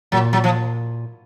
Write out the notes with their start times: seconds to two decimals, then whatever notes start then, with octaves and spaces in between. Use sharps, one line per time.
0.12 A#2 F#3
0.33 F#3
0.44 F3